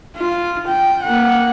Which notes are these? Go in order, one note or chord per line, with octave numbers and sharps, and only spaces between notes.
F4
G5
A#3 F#5